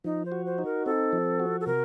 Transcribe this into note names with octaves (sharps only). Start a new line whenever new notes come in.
F3 D#4
C5
F#4
C5
D#4
A#4
C4 A4
F3
F#4
A4
C3 A#4